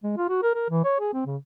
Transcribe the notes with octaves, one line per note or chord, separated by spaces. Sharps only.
G#3
F4
F#4
A#4
A#4
E3
C#5
G#4
C4
C#3